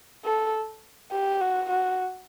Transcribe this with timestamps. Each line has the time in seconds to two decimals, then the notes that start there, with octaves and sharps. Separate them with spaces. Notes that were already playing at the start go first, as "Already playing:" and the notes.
0.25 A4
1.12 G4
1.41 F#4
1.70 F#4